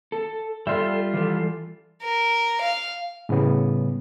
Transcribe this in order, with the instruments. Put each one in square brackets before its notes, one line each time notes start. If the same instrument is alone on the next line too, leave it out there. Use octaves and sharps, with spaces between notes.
[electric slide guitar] A4
[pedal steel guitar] G3 F4 [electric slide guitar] A4 E5
[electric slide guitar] E3 A4
[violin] A#4
F5
[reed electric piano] A2 C#3 G3 B3